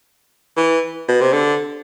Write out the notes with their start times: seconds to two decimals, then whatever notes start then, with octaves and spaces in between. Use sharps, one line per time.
0.57 E3
1.09 B2
1.21 C3
1.33 D3